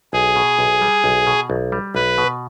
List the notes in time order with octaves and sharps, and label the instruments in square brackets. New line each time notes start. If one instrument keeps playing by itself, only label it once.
[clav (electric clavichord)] B1 [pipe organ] G#4
[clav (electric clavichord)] B2
B1
G3
B1
B2
B1
G3
[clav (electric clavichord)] B1 [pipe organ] B4
[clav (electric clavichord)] B2